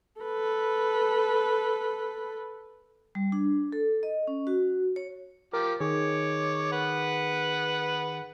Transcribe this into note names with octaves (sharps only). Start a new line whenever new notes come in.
A4 B4
G3
D4
A4
D#5
C#4
F#4
C#5
F3 G4 A#4 D6
D#3 G#4 C#5 D6
B4 F#5